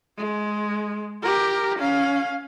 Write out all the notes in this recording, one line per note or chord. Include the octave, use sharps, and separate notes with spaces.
G#3
G4 A#4
C#4 F5